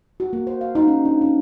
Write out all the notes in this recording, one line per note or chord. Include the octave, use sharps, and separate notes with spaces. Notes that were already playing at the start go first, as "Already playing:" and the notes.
F#4
A#3
C5
F5
D#4
C#4
D4
C#4